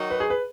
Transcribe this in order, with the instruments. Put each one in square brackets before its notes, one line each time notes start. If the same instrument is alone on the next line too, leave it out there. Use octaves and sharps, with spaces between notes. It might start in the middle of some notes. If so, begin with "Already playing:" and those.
Already playing: [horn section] D#3 F#3 D#4 F#4
[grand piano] B4
G#4
B4